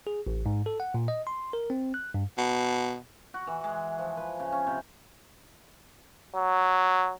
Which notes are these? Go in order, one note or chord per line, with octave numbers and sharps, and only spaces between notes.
G#4
A1
G#2
A4
F#5
A#2
D#5
C6
A#4
C4
F#6
G2
B2
F#4
E3
G#3
F3
B4
C#3
C#4
C3
F#3